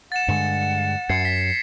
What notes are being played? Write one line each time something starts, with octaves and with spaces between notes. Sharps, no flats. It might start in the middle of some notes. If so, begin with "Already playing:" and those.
F#5 A6 E7
G2 D3 G#3 C#7
F#2 G#6 C7 C#7
B6